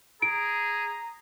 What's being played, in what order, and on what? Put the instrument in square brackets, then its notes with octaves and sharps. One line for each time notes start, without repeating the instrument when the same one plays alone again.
[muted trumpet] G#4 [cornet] A#5 [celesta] D7